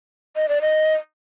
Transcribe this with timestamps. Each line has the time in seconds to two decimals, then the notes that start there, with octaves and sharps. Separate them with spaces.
0.36 D#5
0.49 D5
0.62 D#5